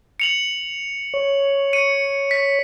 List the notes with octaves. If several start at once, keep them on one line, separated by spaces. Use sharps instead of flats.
C#7 F7 F#7
C#5
C#7 D#7
B6